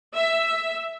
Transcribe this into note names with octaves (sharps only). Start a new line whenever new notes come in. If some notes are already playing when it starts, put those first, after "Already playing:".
E5